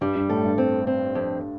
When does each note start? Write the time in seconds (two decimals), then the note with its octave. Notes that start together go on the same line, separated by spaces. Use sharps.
0.01 G2 G3
0.15 G2
0.29 A2 A4
0.44 G2
0.58 C4
0.87 C4
1.15 F2